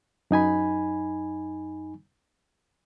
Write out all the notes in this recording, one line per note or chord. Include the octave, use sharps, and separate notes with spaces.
F#2 D#4 G#5 B5